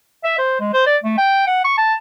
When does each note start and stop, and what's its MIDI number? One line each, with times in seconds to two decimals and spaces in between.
0.24 0.36 76
0.38 0.56 72
0.60 0.70 56
0.73 0.85 72
0.86 0.97 74
1.04 1.16 57
1.18 1.45 79
1.47 1.62 78
1.65 1.77 85
1.77 1.94 81